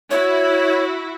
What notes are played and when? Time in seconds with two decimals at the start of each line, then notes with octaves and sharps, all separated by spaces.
0.11 E4 F#4 C#5